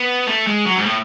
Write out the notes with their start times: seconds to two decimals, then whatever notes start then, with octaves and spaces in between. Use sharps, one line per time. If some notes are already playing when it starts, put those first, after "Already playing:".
Already playing: B3
0.27 A3
0.47 G#3
0.66 F#3
0.75 G#2
0.86 A2